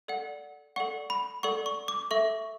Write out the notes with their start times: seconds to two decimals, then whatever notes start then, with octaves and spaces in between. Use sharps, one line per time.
0.08 A4 D5 F#5
0.76 A4 D5 F#5 C#6
1.10 B5
1.43 A4 D5 F#5 C#6
1.66 C#6
1.88 D6
2.11 A4 E5 C#6